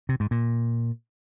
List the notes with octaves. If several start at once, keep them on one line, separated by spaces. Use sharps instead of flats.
C3
G#2
A#2